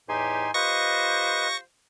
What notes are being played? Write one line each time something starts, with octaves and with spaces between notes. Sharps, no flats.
E2 A2 D#4 G4 G#5 C6
F4 G4 B4 C5 D#5 C#6 A#6